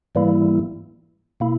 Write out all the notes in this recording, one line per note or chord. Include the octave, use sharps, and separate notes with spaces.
G#2 E3 G3 A#3 E4
B2 A#3 E4